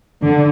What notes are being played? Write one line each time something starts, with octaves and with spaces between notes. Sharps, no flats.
D3